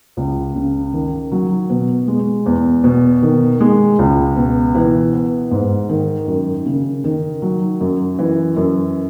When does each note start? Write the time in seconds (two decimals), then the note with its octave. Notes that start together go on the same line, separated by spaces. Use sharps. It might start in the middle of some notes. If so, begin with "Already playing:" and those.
0.17 C#2
0.55 C#3
0.93 D#3
1.31 F#3
1.70 B2
2.08 G#3
2.46 E2
2.84 B2
3.22 D#3
3.60 G#3
3.99 C#2
4.37 B2
4.75 E3
5.13 B3
5.51 G#2
5.90 D#3
6.27 F#2
6.66 C#3
7.04 D#3
7.42 F#3
7.81 F#2
8.19 E3
8.56 F#2